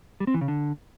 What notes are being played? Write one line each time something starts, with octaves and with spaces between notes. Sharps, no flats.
G3
C4
E3
C#3
D3